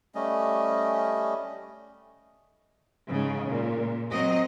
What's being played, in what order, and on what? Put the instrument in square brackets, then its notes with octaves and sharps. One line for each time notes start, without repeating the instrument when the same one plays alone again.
[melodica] G3 A3 C#4 D#5
[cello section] G#2 C#3
A#2
F#3 C4 D#5